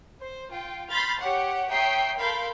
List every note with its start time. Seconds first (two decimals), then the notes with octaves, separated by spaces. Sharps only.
0.21 C5
0.51 F4 G5
0.90 B5 C6 F6 G6 A6
1.19 G4 C#5 F#5
1.70 C#5 E5 G5 A#5 D#6 C7
2.17 A4 A#4 F5 B5 C6 G6